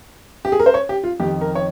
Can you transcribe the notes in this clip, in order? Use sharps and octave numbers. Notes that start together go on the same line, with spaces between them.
G4
G#4
A#4
C5
C#5
G4
F4
F2 D#3 G4
A#4
C#5